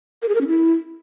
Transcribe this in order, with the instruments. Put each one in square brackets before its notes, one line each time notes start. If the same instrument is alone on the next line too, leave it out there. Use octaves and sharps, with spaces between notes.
[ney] A#4
G#4
A#4
C#4
E4